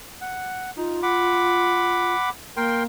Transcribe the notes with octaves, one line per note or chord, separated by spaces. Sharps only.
F#5
D#4 F4
F#5 B5 D6
A#3 A#4 G5 C6